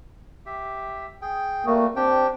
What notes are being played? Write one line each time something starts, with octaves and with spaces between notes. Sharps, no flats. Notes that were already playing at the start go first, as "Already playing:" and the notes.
G4 E5
G#4 G5
G3 A3 A#3 F#4
C4 D4 G4 G5